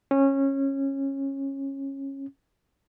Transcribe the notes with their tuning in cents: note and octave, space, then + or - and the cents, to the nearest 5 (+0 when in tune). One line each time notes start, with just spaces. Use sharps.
C#4 -20